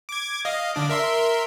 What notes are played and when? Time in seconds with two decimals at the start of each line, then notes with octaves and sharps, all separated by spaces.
0.09 D6 G#6
0.45 D#5 F5
0.75 D3 D4 D6
0.89 A#4 E5 C6